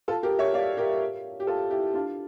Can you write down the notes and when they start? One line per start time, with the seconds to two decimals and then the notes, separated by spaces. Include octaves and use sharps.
0.08 F4 A4
0.23 G4 A#4
0.39 C#5 E5
0.54 D5 F5
0.77 G4 A#4
1.40 G4
1.47 F4 A4
1.70 E4 G4
1.94 D4 F4